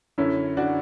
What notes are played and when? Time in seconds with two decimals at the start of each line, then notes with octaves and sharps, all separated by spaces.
0.18 F#2 D3 C#4 E4
0.57 D4 F#4